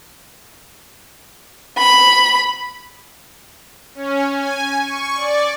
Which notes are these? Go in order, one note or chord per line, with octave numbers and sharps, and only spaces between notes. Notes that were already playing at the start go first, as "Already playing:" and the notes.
B5
C#4
G#5
C#6
D5